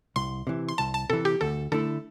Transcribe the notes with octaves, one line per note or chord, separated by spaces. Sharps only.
C2 C6
C3 E3
C6
C2 A5
A5
C3 E3 A4
G4
D2 A4
D3 A3 E4 A4